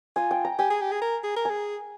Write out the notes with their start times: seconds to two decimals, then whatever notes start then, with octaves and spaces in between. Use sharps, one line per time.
0.16 F4 G#5
0.31 G5
0.45 A#5
0.59 G4 G#5
0.70 G#4
0.81 G4
0.92 G#4
1.02 A#4
1.23 G#4
1.36 A#4
1.45 G#4 G#5